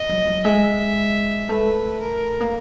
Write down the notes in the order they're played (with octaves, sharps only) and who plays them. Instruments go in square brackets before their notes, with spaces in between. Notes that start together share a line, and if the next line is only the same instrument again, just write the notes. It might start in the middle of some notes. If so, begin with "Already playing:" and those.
Already playing: [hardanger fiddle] D#5
[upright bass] F#3
F#3
[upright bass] G#3 [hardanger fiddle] E5
[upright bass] A3 [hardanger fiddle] B4
[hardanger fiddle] A#4
[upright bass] A#3